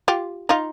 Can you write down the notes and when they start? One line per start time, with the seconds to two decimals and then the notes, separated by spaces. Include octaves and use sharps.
0.08 F4 G4
0.49 D#4 F4